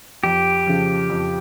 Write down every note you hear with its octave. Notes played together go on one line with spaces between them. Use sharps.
F2 G4
C#3 F3
F2